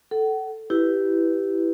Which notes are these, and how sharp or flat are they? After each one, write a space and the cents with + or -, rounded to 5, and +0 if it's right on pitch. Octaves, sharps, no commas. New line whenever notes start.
A4 +0 F#5 +35
E4 +0 G4 -10 B4 +0